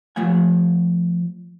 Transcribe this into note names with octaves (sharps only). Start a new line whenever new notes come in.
F3 A3 F#5 G#5